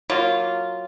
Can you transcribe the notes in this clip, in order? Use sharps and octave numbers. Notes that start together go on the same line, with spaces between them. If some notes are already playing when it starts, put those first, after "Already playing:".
F#3 A#3 F4